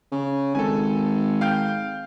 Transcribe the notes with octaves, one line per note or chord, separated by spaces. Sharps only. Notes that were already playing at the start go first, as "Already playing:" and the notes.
C#3
G#1 A4 G#5
F5 G5 G6